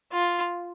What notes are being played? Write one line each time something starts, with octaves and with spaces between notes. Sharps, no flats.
F4